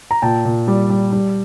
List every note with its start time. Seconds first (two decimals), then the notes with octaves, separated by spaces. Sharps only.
0.11 A#5
0.22 A#2 G5 A5
0.45 A#2
0.68 G3
0.90 G3
1.13 G3